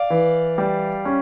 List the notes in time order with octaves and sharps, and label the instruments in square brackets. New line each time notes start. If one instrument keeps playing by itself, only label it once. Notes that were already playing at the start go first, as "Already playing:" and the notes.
Already playing: [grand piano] D5 F5
E3
G3
C#4